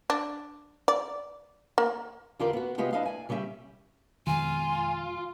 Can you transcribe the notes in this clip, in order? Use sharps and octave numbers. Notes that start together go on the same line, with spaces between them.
D4
D5
A#3
E2 D3 F4 G4 A#4 D5
B3 F#4
C3 G#3 B3 F4 G4
D4 E4 B4 D#5 F5
D5 G#5
C#3 G3 C#4 D#5 E5 G5
F2 B2 D#3 G#3 F4 G#5